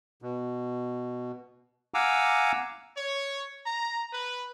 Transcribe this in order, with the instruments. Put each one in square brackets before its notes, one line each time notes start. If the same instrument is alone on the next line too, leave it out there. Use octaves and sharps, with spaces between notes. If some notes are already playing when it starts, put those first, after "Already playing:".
[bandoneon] B2
F5 F#5 G#5 A#5 D6 E6
[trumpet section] C#5
A#5
B4